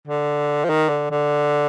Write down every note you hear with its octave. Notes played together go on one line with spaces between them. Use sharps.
D3
F3
D#3
D3
D3